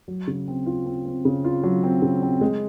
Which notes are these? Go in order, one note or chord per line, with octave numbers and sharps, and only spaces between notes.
F#3
C#3
C4
F4
C4
C4
C#3
F4
F#3
C4
C#3
C4
G#3